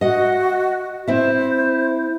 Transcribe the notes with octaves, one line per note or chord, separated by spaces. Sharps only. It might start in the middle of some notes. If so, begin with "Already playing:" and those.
F#4 D#5 F#5
C4 E4 C5 E5